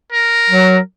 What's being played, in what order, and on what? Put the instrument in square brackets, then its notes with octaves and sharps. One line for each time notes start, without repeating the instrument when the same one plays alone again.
[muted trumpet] A#4
[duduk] F#3